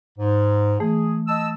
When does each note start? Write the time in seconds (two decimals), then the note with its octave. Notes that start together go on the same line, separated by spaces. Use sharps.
0.18 G#2
0.80 E3 A3 G#4
1.27 D#5 A5 E6